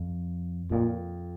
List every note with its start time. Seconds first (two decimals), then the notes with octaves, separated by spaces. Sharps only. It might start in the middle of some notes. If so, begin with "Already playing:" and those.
Already playing: F2
0.71 F2 A#2